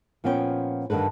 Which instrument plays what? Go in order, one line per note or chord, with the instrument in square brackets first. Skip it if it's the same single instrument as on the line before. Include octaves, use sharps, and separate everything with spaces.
[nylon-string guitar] A#2 F3 B3 C#4 A#4 G5
G2 D3 D#3 A4 B4